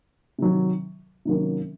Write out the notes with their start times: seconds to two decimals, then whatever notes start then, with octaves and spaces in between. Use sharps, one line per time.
0.38 C3 D#3 F#3
1.25 C3 D#3 F#3 A#3 C#4